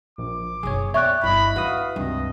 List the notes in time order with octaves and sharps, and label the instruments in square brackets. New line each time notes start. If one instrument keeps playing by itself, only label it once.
[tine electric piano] A#1 [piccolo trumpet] D6
[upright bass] F#1 B1 [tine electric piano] G#4 C#5
[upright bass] B3 [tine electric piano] C#5 D5 G5 [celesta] E5 C#6 F#6
[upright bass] G1 [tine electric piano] E4 D#5 [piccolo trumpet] B5
[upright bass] E4 [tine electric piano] F#4 B4 D#6 [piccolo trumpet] F5
[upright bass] C#2 [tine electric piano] G2 C3 [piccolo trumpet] D#5